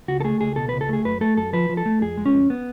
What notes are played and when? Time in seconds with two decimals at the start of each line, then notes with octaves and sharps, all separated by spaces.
0.08 C#2 F#4
0.21 A4
0.24 A3 G#4
0.40 C#2 G#4
0.56 B2 A4
0.69 C#2 B4
0.81 A4
0.89 A3 G#4
1.04 F#2 B4
1.21 A3 A4
1.37 F#2 A4
1.53 F3 B4
1.69 F3
1.77 A4
1.86 A3
2.01 F2 G#4
2.17 G#3
2.26 C#4
2.34 F2
2.50 B3